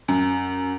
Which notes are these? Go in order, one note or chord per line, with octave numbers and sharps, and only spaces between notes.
F#2